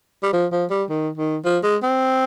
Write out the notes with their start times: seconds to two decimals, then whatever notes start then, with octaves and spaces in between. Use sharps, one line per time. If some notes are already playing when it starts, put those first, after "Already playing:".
0.23 G3
0.33 F3
0.52 F3
0.70 G3
0.89 D#3
1.18 D#3
1.45 F3
1.63 G#3
1.83 C4